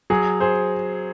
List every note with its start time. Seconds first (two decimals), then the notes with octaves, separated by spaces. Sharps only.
0.10 F#3 G#4
0.40 G#4 C5